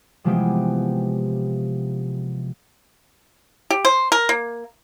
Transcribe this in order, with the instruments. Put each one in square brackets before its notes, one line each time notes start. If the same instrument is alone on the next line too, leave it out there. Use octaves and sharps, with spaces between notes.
[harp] C3 E3 F3 G#3 B3 G4
[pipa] G4
C5
A#4
A#3